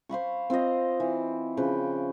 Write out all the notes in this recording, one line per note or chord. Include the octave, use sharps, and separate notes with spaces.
C5 F5 B5 C#6
C4 F4 C5 D#5
E3
C#3 F3 B4 G5